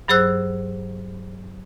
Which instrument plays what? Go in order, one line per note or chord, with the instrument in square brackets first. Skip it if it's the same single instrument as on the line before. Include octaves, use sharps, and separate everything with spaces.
[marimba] G2 F#3 G#4 C5 E6 F#6